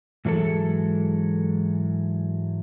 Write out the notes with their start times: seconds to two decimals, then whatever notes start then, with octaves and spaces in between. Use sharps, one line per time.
0.25 G#2 E3 F#3 G#3 A4